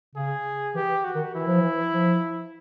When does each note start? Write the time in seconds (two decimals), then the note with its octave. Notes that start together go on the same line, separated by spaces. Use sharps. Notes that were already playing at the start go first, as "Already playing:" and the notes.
0.15 C#3 G#4
0.75 E3 G4
1.04 F#4
1.15 D#3
1.34 E3 E4
1.47 F3
1.59 E3
1.94 F3